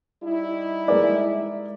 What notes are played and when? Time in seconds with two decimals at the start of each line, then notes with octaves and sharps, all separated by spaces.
0.23 G3 D#4 E4
0.88 G#3 A#4 D5